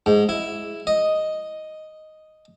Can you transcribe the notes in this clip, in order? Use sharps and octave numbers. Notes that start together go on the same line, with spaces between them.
G#2
E4
D#5